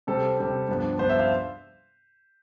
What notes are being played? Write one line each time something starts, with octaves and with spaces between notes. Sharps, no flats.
C3 G3 C4 A4
C3 G3 C4
G2 F3 B3 D4
G2 F3 B3 D4 C5
E5
F5